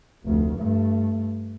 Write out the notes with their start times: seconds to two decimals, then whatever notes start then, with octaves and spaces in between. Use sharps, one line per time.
0.25 F1 D2
0.59 G2 A3